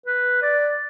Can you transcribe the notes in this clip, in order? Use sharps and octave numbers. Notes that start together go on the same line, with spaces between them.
B4
D5